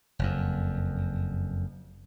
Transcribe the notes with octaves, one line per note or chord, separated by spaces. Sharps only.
F#1 F2